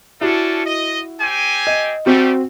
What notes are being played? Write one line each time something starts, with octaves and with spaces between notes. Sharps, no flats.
C#4 D4 E4 F#4 A4
D#5
C4 G4 G#5
D#5
G3 A3 C4 F#4